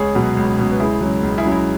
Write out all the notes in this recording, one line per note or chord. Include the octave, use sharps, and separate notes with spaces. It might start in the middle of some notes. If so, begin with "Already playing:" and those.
Already playing: C#2 G#4 C#5
B2 F#3
C#2
B2 F#3
B4
C#2 E4 G#4
C#3 F#3
C#2
E4 G#4
C#3 F#3
E4